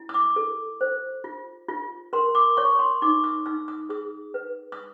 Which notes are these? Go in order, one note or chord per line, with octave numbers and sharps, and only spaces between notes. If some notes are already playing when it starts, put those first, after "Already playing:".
Already playing: E4
D#6
D6
A4
C5
F4
F4
A#4 C6
D6
C#5 C#6
C6
D#4 D6
D#6
D#4 E6
D#6
G#4 D#6
B4
D#6